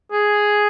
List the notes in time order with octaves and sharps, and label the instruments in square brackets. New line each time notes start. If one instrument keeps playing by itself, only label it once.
[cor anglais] G#4